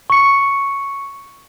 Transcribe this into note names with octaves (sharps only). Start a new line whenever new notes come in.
C#6 C#7